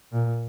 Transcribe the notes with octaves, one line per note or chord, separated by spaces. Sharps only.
A#2